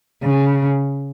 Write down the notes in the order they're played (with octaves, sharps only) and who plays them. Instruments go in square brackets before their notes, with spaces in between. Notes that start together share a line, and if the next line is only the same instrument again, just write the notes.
[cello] C#3